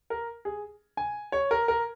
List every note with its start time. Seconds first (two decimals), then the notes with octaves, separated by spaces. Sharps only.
0.10 A#4
0.45 G#4
0.97 G#5
1.32 C#5
1.51 A#4
1.68 A#4